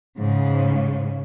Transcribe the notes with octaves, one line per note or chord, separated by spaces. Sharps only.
G#2 C#3